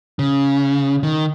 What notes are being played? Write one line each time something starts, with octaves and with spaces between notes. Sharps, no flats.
C#3
D#3